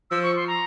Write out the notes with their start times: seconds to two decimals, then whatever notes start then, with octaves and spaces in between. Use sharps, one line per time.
0.10 F3 E6
0.23 C#6
0.36 C6
0.47 A#5